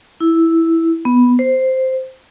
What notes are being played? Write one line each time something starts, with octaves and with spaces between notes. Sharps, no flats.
E4
B3
C5